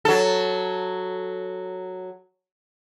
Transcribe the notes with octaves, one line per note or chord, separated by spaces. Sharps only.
F#3 A4